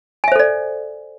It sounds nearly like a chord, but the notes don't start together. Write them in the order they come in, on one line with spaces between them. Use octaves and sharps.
G#5 E5 C5 A4 D5